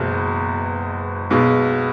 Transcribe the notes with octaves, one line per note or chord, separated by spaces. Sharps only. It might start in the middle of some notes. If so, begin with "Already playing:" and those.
Already playing: F#1 E2 B2 G#3
B1 B2 G#3